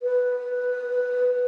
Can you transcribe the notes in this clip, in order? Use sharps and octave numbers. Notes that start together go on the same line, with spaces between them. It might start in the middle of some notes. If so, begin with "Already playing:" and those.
B4